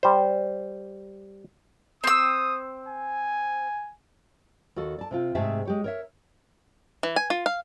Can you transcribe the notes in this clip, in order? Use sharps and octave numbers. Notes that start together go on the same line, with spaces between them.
G3 C5
C4 D#6 E6
G#5
D#2 F#4 A4
D5 A5
C3 C4 F4
G#2 C3 A3 G#4 E5 A5
G#3 G4 C#5
A#4 C#5 E5
E3
G#5
F4
F5